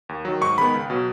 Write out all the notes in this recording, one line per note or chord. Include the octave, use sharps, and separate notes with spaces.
D#2
D#3 F#3
G#2 C#6
D#3 G#3 B3 B5
C#2
B2 F#3